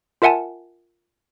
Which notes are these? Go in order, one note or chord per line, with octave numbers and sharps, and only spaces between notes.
F4 A#4 E5 F#5 G#5 A5